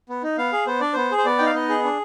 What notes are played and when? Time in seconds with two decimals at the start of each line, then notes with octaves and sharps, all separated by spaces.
0.09 B3
0.23 D#4
0.38 B3 F5
0.53 G#4
0.67 B3 C5
0.80 D4 D5
0.93 B3 C5
1.11 G#4
1.18 C5
1.25 B3 D5
1.38 D#4 G5
1.46 F5
1.54 B3 D#5
1.69 G#4
1.84 D4